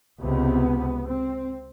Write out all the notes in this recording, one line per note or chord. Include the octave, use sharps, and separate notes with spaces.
C#2 C3 B3
C4